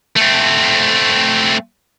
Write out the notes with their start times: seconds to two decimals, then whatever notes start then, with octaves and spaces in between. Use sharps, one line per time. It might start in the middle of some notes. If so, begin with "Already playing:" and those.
0.16 A3 C4